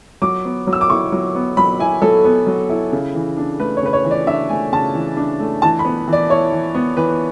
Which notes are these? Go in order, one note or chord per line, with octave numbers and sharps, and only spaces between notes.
F#3 D6
B3
F#3
E6
D6
E4 C#6
F#3
B3
F#3 B5
E4 G#5
F#3 A4
B3
F#3
E4
C#3
E3
D4
A3 B4
C#5
C#3 B4
C#5
E3
D5
D4 E5
A3 G#5
C#3 A5
E3
D4
A3
E3 A5
B5
B3
E3 D5
E4 C#5
E3
B3
E3 B4